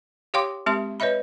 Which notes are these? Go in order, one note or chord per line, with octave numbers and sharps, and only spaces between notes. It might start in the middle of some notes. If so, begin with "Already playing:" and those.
G4 C#5 F5 G5 C6 D6
G#3 C4 G4 E5 C6
B4 C#5 D#5 E5 B5